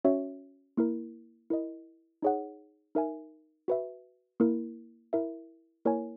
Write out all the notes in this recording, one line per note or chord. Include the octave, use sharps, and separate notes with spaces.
C#4 F#4 C#5 E5
A#3 E4 A#4
E4 A#4 D#5
D#4 G#4 C#5 F#5
D#4 A#4 E5 G#5
F#4 B4 E5
A#3 E4 A#4
E4 A#4 E5
A#3 E4 A#4 C#5 G#5